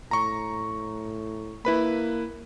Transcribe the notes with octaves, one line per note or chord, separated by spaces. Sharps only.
A2 A#5 C#6
A#3 E4 B4 B5